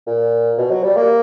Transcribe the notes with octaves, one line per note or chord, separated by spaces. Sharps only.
A#2
B2
F#3
G3
A#3